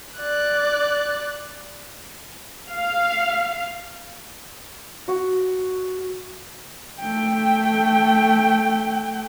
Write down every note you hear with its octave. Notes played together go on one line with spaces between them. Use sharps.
D5 F#6
F5
F#4
A3 G5